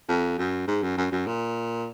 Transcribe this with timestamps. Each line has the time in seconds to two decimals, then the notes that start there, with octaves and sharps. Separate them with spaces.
0.09 F2
0.38 F#2
0.67 G#2
0.82 F#2
0.97 F#2
1.12 F#2
1.27 A#2